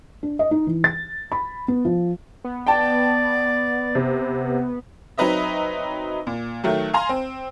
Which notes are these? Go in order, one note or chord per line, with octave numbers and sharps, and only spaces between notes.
D4
D#5
D#4
E3
A6
B5
B3
F3
B3
D5 G5 A5
C3
F#3 C4 D#4 B4 D#5 E5
A#2
D#3 F#3 A3
F5 G#5 A#5 C6
C4